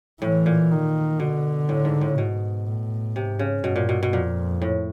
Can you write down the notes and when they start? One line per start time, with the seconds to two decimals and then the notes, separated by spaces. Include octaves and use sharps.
0.21 A2 E3
0.46 A#2
0.71 D#3
1.19 B2 D3
1.69 A2
1.85 G#2
2.01 A2
2.17 G#2 B2
2.67 A2
3.16 G#2 C3
3.39 C#3
3.64 G2 B2
3.76 A#2
3.89 B2
4.03 B2
4.13 F2 A#2
4.62 A2